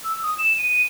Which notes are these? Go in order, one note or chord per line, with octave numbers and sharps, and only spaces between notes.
E6
D#6
E7
D#7